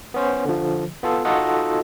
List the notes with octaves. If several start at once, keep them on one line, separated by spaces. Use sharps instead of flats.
B3 C#4 C5
D3 F3
B3 F4 A4
D#4 F4 F#4 A4 D#5 F#5